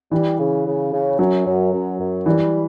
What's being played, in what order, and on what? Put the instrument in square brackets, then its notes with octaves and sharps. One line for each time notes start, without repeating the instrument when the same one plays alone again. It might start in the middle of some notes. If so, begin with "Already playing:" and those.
[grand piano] E3 [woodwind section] G3
[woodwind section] C#3
C#3
C#3
[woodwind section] F#2 [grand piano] F#3
[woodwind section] F#2
F#2
F#2
[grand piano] E3 [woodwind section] G3